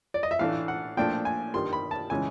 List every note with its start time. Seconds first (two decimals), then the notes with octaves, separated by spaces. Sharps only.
0.14 D5
0.23 D#5
0.31 E5
0.39 A2 E3 A3 D4 F5
0.68 F#5
0.97 A#2 F3 A3 D4 G5
1.25 G#5
1.54 G2 D#3 G3 C6
1.73 B5
1.91 A5
2.10 C#3 E3 G#3 C#4 G#5